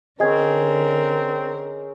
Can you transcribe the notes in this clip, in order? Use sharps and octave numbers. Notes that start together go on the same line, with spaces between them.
D3 C4 C#4 G#4 A#4 D#5 G#6